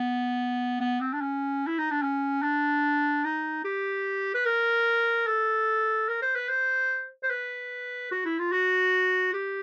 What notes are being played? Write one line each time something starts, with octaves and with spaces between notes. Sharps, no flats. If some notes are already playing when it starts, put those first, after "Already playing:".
Already playing: B3
B3
C4
D4
C#4
E4
D#4
D4
C#4
D4
D#4
G4
B4
A#4
A4
A#4
C5
B4
C5
C5
B4
F#4
E4
F4
F#4
G4